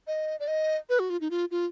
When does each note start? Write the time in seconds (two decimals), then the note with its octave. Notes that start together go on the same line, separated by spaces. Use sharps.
0.07 D#5
0.40 D5
0.48 D#5
0.89 B4
0.99 F#4
1.10 F4
1.21 D#4
1.31 F4
1.51 F4